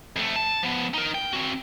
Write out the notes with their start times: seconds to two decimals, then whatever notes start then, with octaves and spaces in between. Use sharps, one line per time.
0.16 F2 A3
0.36 A5
0.63 F3 B3
0.94 D#4 A#4
1.15 G5
1.33 C4 F#4